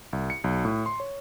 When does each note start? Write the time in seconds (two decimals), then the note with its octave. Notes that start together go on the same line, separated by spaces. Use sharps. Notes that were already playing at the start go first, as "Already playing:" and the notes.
0.13 C2
0.30 C#7
0.44 B1
0.65 A2
0.86 C6
1.00 C#5